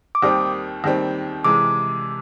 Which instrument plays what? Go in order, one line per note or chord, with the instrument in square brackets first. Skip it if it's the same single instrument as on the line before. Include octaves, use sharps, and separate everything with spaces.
[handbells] D6
[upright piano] D#2 D#3 G3 C4 [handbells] D#6
[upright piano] D#2 D#3 G3 C4
[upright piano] C3 E3 G#3 [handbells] D6